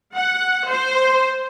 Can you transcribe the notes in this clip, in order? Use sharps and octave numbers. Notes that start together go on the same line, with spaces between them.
F#5
C5